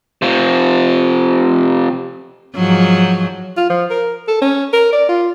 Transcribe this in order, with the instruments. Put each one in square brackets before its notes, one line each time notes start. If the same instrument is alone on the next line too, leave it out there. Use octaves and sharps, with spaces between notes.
[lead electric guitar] C3 F3
[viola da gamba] G#2 F3 F#3
[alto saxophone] F4
F3
A#4
A4
C#4
A#4
D5
F4